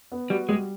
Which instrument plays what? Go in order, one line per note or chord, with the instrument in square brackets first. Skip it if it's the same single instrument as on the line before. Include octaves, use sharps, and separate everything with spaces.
[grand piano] B3
[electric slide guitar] G3 [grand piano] F#4
[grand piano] G3 [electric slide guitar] G#3